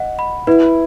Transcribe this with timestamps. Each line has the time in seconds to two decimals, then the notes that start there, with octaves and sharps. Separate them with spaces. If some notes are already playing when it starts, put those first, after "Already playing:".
Already playing: D#5 F#5
0.19 B5
0.47 E4 B4